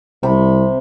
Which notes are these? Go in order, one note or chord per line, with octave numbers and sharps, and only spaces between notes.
C2 C3 B5